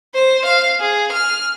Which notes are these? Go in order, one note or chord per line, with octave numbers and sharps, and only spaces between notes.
C5
F5
G#4
F6